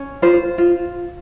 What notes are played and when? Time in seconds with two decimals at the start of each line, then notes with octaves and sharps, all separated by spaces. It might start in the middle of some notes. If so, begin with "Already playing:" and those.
Already playing: C#4
0.22 F4 C5
0.58 F4